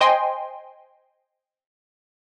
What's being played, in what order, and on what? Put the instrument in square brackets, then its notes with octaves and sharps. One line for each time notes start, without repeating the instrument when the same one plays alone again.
[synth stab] C5 D#5 G5 G#5 C6